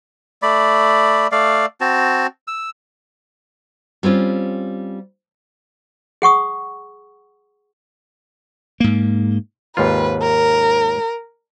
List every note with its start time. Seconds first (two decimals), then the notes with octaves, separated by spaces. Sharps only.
0.42 A3 D5 B5
1.32 A3 D5 F5
1.81 C4 F#4 A5
2.48 E6
4.03 G3 C4 C#4 F4
6.22 G#4 F#5 C#6 D#6
8.80 G#2 A#3
9.77 D#2 G#2 F4 B4
10.22 A#4